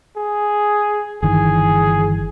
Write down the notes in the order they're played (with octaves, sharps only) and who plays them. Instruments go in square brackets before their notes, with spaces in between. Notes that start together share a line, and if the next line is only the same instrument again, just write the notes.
[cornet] G#4
[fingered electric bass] G1 D#3 E3 [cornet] G#4